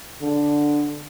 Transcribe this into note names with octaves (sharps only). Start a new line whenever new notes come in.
D3